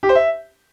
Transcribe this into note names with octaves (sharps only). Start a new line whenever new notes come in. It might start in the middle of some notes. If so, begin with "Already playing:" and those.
G4
C5
E5